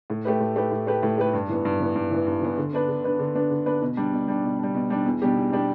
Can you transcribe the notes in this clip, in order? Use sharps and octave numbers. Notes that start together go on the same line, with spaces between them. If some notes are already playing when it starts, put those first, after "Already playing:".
A2
A3 G4 B4
A2
A3 G4 B4
A2
A3 G4 B4
A2
A3 G4 B4
G2
E3 B3
G2
E3 B3
G2
E3 B3
G2
E3 B3
D3
B3 D4 B4
D3
B3 D4 B4
D3
B3 D4 B4
D3
B3 D4 B4
B2
G3 D4
B2
G3 D4
B2
G3 D4
B2
G3 D4
E2
B2 G3 D4 G4
E2
B2 G3 D4 G4